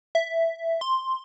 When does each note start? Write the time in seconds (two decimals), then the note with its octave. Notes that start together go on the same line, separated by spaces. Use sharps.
0.15 E5
0.81 C6